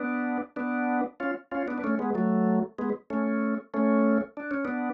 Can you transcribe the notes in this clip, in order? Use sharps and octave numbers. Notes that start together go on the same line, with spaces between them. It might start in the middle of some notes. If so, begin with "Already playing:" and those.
Already playing: B3 D4
B3 D4
C#4 F4
C#4 F4
B3 D4
D4
A3 C#4
G#3 B3
F#3 A3
G#3 B3
A3 C#4
A3 C#4
D4
C#4
B3 D4